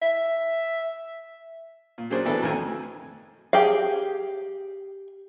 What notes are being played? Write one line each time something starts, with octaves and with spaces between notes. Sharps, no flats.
E5
A#2
F#3 A#3 C#4 D4 G#4 C5
B2 E3 B3 D4 A4
F2 A2 D#3 F#3 G#5 A#5
G4 G#4 F5